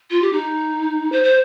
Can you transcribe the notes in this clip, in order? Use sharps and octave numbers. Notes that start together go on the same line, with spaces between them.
F4
G4
D#4
C5
C5